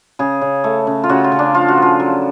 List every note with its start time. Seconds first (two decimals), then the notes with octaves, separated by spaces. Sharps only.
0.19 C#3 G#4
0.41 C#3
0.64 A3
0.87 C#3
1.04 F4
1.09 C#3 F#4
1.24 F4
1.32 C#3
1.39 D4
1.54 F3 F4
1.68 F#4
1.77 F3 F4
2.00 F#3